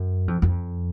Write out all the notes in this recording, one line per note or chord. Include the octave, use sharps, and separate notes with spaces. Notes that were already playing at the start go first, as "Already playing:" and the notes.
Already playing: F#2
F2
F2